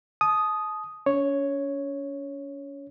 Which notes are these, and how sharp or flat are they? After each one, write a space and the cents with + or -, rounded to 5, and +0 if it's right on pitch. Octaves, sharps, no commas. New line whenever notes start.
A5 -35 D#6 +0
C#4 +35 C#5 +0